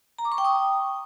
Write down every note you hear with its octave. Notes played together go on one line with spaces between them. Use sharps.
A#5
D6
C#6
G5
D#6